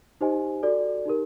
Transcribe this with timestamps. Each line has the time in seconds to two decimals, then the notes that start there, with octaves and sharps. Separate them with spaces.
0.21 D#4 G4 C5 D#5 G#5
0.63 F#4 A4 D5
1.05 D#4 G4 A#4